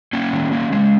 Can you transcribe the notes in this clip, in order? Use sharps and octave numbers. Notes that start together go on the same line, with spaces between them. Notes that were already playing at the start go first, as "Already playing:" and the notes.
A#3 C#4
D#3
A#3
G#3